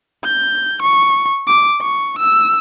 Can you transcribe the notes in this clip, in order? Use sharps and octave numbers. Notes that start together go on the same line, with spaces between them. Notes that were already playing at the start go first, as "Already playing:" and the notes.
G6
C#6
D6
C#6
E6